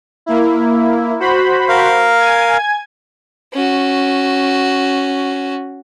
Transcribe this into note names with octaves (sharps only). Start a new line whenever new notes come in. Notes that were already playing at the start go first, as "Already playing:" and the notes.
A#3 E4
F#4 C5 B5
A#4 F5
G#5 G#6
C#4 F#4